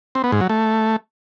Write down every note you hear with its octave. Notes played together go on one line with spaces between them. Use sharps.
C4
B3
G#2
F#3
A3